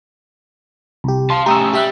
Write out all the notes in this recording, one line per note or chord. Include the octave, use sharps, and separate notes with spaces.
C2 G4
F5 A5 C6
A3 C#4 G4 A#5 D#6 E6
G3 G4 E5 F#6